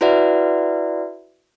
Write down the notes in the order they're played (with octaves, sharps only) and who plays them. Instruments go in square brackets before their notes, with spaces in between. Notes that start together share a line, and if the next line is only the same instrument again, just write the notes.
[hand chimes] E4 F#4 B4 D5 E5 F#5